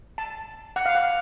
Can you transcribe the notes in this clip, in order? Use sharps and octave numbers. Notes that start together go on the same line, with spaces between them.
A5
F#5
F5
F#5